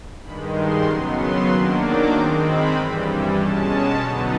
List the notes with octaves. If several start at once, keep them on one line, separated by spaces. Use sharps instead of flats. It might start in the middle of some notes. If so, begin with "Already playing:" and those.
G2 D#3 G#3 B5
C6
C#3 F#3 B3
C6
D#3 F#3 A#3 D4
D6
D#3 G#3 C4 C6
B5
G2 E3 G3
B2 G#3 C#4 A5
D3 F#3 B3 D#4